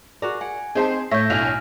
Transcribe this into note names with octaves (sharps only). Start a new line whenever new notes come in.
F#4 G#4 A#4 D5
F#5 G#5
C4 D#4 G4 G#4 C5 A5
A2 C#5 E5 G6 A#6
B1 D4 E4 F5 G#5 F6 F7